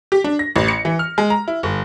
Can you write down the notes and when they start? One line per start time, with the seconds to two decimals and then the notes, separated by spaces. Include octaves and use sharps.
0.12 G4
0.24 D4
0.39 A#6
0.56 A1
0.68 C#7
0.85 E3
0.99 F6
1.18 G#3
1.30 A#5
1.48 E4
1.63 G1